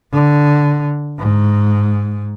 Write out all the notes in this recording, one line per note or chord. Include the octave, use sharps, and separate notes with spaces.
D3
G#2